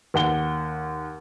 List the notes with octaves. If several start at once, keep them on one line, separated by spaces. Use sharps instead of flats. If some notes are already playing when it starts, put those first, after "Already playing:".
D#2 F#5 G7